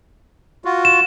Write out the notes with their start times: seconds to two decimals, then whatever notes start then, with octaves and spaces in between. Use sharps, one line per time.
0.65 F4 F#4
0.85 E7